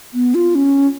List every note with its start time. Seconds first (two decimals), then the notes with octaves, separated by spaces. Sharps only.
0.14 B3
0.35 F4
0.55 C#4